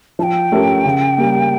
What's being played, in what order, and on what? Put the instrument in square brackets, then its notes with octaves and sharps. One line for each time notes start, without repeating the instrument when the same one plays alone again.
[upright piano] F3 [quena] A5
[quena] G5
[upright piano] A3 C#4 G4 A#4
C#3
G3 A#3